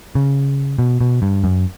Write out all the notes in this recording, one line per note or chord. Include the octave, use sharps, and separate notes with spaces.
C#3
B2
B2
G2
F#2